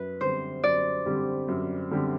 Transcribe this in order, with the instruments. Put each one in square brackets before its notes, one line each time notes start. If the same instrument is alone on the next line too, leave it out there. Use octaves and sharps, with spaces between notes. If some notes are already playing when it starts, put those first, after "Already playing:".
Already playing: [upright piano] F#2 [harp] B4
[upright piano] D3 G3 C4 G4 [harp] C5
[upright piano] F#2 [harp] D5
[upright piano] D3 G3 C4 G4
F#2
D3 G3 C4 G4